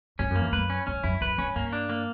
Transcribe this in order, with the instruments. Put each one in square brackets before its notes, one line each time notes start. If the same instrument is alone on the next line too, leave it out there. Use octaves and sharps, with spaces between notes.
[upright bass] G2 [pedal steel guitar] C#4
[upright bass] F#2
[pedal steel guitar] A#3
[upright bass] E2
[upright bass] F#2 [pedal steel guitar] B4
[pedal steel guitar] C#4
[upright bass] G2 [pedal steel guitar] C#4
[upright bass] F#2 [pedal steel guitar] E4
[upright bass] F#2 [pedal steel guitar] B4
[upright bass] G2 [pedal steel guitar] C#4
[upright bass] G2 [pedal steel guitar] A#3
[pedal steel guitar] D4
A#3